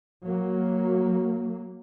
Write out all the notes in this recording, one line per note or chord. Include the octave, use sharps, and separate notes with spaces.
F#3 A#3